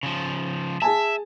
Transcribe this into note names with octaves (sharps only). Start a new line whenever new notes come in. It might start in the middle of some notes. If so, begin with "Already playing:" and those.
C#3 F3
G#4 E5 G#5 A5